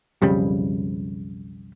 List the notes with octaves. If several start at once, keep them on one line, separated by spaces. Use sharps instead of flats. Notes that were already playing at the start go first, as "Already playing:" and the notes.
B1 F2 C#3 G3